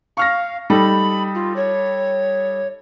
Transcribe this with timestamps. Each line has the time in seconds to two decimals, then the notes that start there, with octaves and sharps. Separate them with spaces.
0.17 F5 C#6 F6 A#6
0.70 G3 D#4 A4 B5
1.35 F4
1.56 C#5